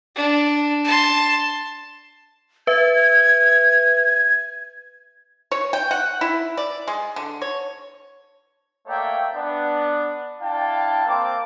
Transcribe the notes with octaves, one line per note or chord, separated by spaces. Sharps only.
D4
A5 C6
B4 E5 G#6
C#5
G5
F#5
E4
D5
G#3
D3
C#5
A3 A#3 C#5 D5 E5 G5
B3 D4
D4 E4 F5 G5 A5
A#3 C4 D6